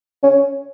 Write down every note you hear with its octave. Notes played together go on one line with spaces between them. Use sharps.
C#4